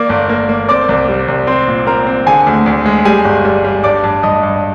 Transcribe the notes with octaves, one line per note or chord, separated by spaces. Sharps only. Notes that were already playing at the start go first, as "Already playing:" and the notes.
Already playing: A#3 D5 D6
G1
A#3
A#3
C4 D5 D6
C2
G3
C2
C4 C5 C6
A#2
C4 A#4 A#5
C4
D3 G#4 G#5
D2
D2
G#3
G3 G#4 G#5
G1
G3
G3
G2 D5 D6
G2
G2 D#5 D#6
G2